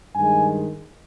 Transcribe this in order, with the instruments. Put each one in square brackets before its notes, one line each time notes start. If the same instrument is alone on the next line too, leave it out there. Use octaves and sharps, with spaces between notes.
[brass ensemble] G2 D#3 G#3 G#5